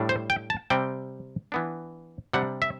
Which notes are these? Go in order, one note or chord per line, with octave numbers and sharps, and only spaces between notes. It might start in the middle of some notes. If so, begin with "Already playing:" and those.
Already playing: A2 G3 D4
C5
G5
A5
C3 G3 C4 G5
E3 B3 D4
C3 G3 D4 F#5
E5